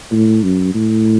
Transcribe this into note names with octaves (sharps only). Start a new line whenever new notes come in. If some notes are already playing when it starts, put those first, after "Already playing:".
A2
F#2
A2